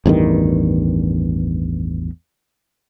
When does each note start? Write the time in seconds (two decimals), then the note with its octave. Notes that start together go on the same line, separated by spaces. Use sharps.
0.06 A1 E2 G2 D#3